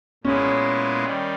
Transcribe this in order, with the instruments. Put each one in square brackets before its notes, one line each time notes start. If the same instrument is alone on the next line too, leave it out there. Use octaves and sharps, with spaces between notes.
[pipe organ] A#2 G#3 B3 E4 G#4 [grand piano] C#4
[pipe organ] D#3 G3